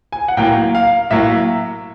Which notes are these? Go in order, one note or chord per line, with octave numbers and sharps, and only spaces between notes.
G#5
F#5
A2 F#3 A#3 G5
F5
A2 F#3 A#3 E5